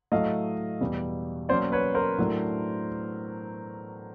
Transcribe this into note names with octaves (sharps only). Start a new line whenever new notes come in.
A2 F#3 A3 D#5 F5
E2 B2 G3
B2 F#3 A#3 C#4 C5 D5
B4 C#5
A#4 C5
A2 F#3 A3 D4